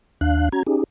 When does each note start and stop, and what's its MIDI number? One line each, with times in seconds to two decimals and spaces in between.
0.21 0.49 39
0.21 0.49 62
0.21 0.49 77
0.21 0.49 90
0.52 0.63 61
0.52 0.63 66
0.52 0.63 82
0.52 0.63 92
0.67 0.84 61
0.67 0.84 63
0.67 0.84 67
0.67 0.84 68